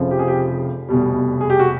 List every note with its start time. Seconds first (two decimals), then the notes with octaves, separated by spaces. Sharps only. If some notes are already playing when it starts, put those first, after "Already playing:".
Already playing: F1 F2 C#3 F3
0.11 G4
0.19 G#4
0.28 G4
0.88 F1 E2 B2 G3
1.41 G#4
1.50 G4
1.59 F#4